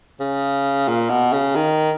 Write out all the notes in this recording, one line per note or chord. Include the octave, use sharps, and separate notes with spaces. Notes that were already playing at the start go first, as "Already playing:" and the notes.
C#3
A#2
B2
C#3
D#3